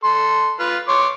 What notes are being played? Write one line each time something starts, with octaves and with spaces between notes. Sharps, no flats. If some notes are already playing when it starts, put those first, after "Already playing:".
A4 C6
F4 B4
C#5 C6 D6